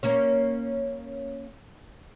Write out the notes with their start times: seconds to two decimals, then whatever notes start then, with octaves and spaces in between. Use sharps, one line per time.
0.03 A#3 C#4 C#5